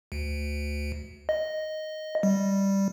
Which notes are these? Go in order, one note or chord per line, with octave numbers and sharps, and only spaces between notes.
D2
D#5
G3